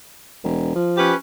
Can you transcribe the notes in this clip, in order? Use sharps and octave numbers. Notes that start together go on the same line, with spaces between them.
E1
F3
C#4 G4 B4